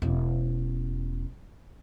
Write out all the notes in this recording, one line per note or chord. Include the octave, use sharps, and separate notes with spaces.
E1 C#4